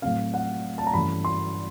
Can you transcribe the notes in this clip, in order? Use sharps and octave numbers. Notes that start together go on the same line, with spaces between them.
A2 F#3 A3 C4 F5
F#5
A5
A#5
G2 E3 A3 C#4 B5
C6